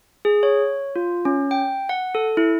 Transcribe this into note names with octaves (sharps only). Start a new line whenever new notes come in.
G#4
C#5
F4
C#4
G5
F#5
A4
E4